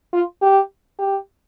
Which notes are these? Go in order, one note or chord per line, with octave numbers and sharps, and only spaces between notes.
F4
G4
G4